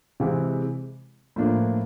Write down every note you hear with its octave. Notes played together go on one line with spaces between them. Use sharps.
C3 E3 G#3
A2 F3 A#3 D4